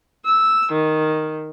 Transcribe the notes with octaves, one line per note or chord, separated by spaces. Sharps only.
E6
D#3